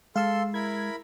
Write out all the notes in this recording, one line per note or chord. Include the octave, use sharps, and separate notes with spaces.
G#3 A4 F5 C6 E6
E4 A#4 B5 G#6